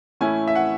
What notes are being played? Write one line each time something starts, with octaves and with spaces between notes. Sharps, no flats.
A2 E3 A3 C#4 E4 G#5
E5
F#5